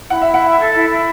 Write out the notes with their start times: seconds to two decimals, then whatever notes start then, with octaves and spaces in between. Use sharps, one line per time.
0.09 E4 F#5
0.22 E4 E5
0.34 F#5
0.42 E5
0.58 A4
0.74 E4
0.89 E4